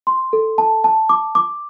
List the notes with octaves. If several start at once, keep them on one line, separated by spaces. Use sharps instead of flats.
C6
A4
A5
A5
D6
D6